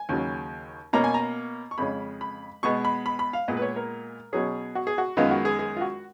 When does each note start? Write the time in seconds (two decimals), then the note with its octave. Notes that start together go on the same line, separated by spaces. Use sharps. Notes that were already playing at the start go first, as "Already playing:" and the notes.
Already playing: G#5
0.09 D#2 C#3 F#3
0.93 B2 A#3 C#4 A#5
1.04 G#5
1.14 A#5
1.71 C#6
1.78 F2 C#3 G#3 C#4 B5
2.21 B5
2.63 B2 G#3 B3 C#6
2.85 B5
3.06 B5
3.19 B5
3.33 F5
3.48 A#2 G#3 B3 D#5
3.57 B4
3.62 C#5
3.76 A#4
4.33 B2 F#3 C#4 G#4
4.75 F#4
4.87 G#4
4.98 F#4
5.17 F#2 D#3 G#3 B3 F4
5.31 F#4
5.45 G#4
5.59 G#4
5.77 F4
5.81 F#4